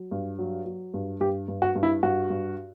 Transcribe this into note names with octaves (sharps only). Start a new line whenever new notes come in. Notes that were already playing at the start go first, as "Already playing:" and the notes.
Already playing: F#3
G2
F#3
F#3
G2
G2 G4
G2
F#4
G2
E4
G2 F#4
G2